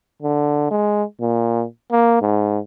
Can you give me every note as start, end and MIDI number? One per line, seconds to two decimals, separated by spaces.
0.22 0.66 50
0.71 1.03 56
1.21 1.65 46
1.92 2.19 58
2.21 2.59 44